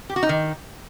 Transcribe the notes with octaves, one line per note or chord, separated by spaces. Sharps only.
G4
F#4
D#4
D#3